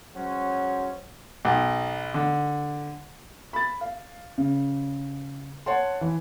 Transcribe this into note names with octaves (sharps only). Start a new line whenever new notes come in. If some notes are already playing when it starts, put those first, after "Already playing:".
F#3 G#3 C#4 F#4 C5
B1
D3
B5 A6
F5
C#3
C#5 F#5 A5 C6
E3